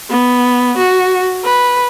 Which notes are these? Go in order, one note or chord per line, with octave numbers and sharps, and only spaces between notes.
B3
F#4
B4